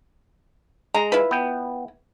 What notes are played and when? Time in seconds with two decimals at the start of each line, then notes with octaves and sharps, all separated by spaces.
0.94 G#3 A#5
1.12 E4 F4 B4
1.31 B3 G5